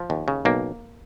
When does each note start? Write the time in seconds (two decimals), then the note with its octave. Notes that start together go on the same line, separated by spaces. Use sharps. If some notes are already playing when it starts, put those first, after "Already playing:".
Already playing: F3
0.10 D#2
0.28 C#3
0.45 B1 A#3